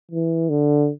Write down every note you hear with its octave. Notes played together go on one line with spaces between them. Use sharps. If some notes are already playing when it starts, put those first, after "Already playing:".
E3
D3